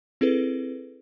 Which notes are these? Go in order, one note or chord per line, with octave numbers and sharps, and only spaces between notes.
C4 E4 G#4 A4 B4